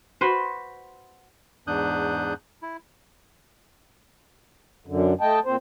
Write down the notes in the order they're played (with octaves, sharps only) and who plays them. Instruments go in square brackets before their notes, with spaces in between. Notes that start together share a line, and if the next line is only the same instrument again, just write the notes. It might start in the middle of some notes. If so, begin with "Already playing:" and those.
[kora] F#4 B4 C5
[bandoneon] E2 G#2 D4 D#6 F#6 G6
E4
[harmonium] F#2 D3
A3 D#5 G5 A5
A#2 C4 C5